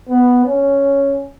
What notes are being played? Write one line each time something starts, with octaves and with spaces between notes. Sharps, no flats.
B3
C#4